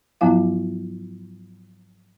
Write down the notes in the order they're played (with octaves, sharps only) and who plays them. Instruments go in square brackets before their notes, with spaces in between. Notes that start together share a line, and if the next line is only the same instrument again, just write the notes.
[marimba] G#2 F3 F#3 B3 E4 F5